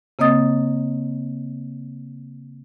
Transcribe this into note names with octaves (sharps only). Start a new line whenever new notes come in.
C#3 A#3 C4 D#5 D#6 A6